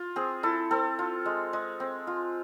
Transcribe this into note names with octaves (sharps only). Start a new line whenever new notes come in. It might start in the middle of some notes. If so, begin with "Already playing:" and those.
Already playing: F4
C4 G#4
E4 A4
C4 A4
F4
G#3
G#3
C4
F4